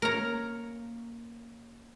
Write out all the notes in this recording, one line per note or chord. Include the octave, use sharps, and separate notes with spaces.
A#3 C#4 A#4 C#5 A#5